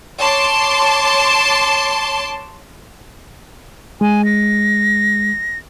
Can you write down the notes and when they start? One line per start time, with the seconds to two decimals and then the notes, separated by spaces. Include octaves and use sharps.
0.20 C#5 A5 C6 D6
4.01 G#3 G#5
4.25 A#6